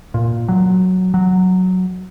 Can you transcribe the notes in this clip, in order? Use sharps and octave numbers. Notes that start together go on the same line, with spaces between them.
A#2
F#3
F#3